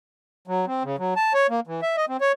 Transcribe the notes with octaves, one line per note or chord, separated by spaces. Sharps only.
F#3
C4
C#3
F#3
A5
C#5
A#3
E3
E5
D#5
C4
C#5